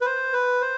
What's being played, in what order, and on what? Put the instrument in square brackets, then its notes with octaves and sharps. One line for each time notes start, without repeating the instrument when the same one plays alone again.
[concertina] B4
C5
B4
C5